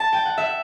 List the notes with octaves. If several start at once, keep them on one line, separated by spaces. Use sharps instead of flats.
A5
G5
F#5
E5